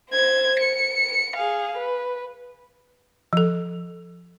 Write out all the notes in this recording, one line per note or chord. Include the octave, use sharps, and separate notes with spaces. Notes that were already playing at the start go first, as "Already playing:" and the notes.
C5 G#6
C#7
G#4 F5
B4
F3 A4